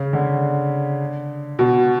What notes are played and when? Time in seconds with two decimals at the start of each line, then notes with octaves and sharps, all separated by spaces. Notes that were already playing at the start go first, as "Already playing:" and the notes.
Already playing: C#3
0.13 D3
1.59 B2